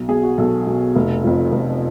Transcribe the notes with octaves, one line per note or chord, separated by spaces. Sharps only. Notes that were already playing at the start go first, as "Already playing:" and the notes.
Already playing: B1
B2 G#4
F#4
B1 A4
B2
F1
F2 F3
F1